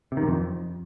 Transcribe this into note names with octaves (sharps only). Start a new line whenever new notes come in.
C3
D#3
F#2
F2